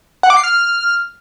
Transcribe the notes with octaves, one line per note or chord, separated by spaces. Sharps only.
F#5
D6
C7
F6